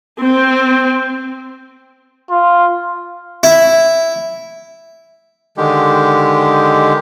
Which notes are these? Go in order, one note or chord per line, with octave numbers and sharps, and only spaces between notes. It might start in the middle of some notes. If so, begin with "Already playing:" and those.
C4
F4
E4
D3 D#3 G#3 G4